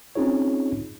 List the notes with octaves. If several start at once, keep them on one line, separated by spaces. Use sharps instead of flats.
C4 C#4 D#4 F4 G#4 C#5